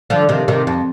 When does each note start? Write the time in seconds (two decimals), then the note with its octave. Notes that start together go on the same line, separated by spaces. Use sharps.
0.10 D3 F3
0.29 C3 D#3
0.48 C3 D#3
0.67 F2